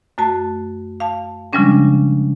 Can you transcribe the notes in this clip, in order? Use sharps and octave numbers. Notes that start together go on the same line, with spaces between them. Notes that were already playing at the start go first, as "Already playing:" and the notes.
F#2 A3 F#4 A5
F5 A5
C#3 F3 G3 G#3 C#4 D4